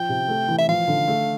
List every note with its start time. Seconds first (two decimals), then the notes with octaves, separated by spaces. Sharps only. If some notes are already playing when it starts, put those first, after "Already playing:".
Already playing: F3 G5
0.09 C3
0.28 A3
0.48 E3
0.58 E5
0.68 F3 F5
0.88 D3
1.08 A3